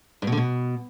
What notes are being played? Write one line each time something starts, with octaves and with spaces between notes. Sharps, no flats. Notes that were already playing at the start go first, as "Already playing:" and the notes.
G2
B2
D3
B2